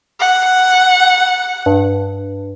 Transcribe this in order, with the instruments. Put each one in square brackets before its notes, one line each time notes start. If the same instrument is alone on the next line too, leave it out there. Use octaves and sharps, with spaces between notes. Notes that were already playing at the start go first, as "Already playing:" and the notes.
[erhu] F#5
[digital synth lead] G2